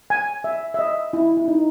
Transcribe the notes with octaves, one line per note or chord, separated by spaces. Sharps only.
G#5
E5
E5
D#5
E4
E4
D#4